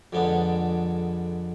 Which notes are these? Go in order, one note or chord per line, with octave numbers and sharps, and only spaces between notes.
F2 D3 G#3 B3 D4